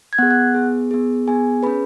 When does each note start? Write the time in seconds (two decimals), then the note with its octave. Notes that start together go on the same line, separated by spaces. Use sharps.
0.13 G#6
0.18 B3 G#4 F#5 F#6
0.30 F#5 F#6
0.54 B3 G#4
0.91 B3 G#4
1.27 B3 G#4 G#5
1.63 C#4 G#4 B4 B5